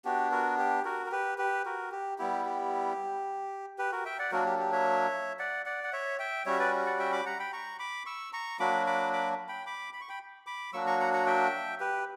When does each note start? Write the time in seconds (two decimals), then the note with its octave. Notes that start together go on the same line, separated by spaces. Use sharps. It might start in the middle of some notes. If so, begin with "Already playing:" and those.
0.05 B3 D4 F#4 G4
0.31 F#4 A#4
0.58 G4
0.85 F#4 A#4
1.06 A#4
1.12 G4 B4
1.38 G4 B4
1.65 F#4 A#4
1.91 G4
2.18 G3 B3 E4 G4
2.45 G4
3.79 G4 B4
3.92 F#4 A#4
4.05 E5 G5
4.19 D5 F#5
4.32 F#3 A#3 D4 F#4 A#4
4.45 G4
4.59 G4
4.72 C#5 E5
5.39 D5 F#5
5.66 D5 F#5
5.84 F#5
5.93 C#5 E5
6.19 E5 G5
6.46 G3 C#4 F#4 C#5 E5
6.59 B4 D5
6.86 D5 F#5
6.99 E5 G5
7.12 B5 D6
7.26 F#5 A#5
7.40 G5 B5
7.53 A#5 C#6
7.79 B5 D6
8.06 C#6 E6
8.33 A#5 C#6
8.60 F#3 A#3 D4 F#4 B5 D6
8.87 B5 D6
9.13 B5 D6
9.48 G5 B5
9.66 B5 D6
9.93 B5
10.01 C#6
10.09 G5 B5
10.47 B5 D6
10.73 F#3 A#3 D4 F#4 C#6 E6
10.87 A#5 C#6
11.00 F#5 A#5
11.13 F#5 A#5
11.26 E5 G5
11.80 G4 B4